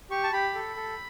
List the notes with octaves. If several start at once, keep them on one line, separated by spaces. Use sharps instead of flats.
G4 C#6
A5
G4 B5
A4
A4